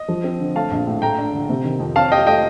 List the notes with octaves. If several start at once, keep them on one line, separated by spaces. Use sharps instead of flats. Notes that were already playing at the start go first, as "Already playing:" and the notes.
Already playing: D#5
F3
C4
D3
A3 F5 A5
A#1
A2
A3 G5 A#5
D4
D3
C3
D#3
F2
C4 F5 A5
G4 D#5 G5
A3 D#5 G5